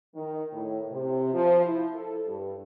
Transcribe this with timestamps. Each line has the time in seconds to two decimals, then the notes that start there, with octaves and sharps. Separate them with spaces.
0.15 D#3
0.52 A2
0.91 C3
1.34 F3
1.64 E4
1.95 A4
2.27 G2